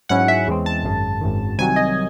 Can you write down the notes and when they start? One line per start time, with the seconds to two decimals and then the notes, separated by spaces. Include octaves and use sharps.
0.09 G#2 F#3 C#4 E4 F#5
0.28 E5
0.47 E2 C#3 E3 G#3 C4
0.66 A5
0.83 G#1 F#2 C#3
1.21 G#1 F#2 D#3
1.58 C2 C3 D#3 F#3 G#5
1.76 D#5